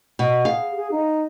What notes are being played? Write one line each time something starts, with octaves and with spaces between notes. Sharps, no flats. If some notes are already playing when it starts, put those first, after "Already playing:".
B2
G#4 F5
G#4
D#4